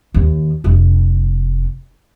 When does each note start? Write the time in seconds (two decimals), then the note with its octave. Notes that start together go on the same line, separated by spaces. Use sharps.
0.14 D#2
0.64 F1 D4